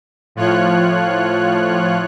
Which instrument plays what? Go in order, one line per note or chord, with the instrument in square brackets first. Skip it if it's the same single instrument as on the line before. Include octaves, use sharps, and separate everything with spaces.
[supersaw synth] A2 F3 F4 C#5 F#6